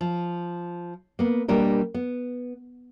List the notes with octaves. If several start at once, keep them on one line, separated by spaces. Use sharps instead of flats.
F3
A#3 B3
B2 G3 A#3 D4 A#4
B3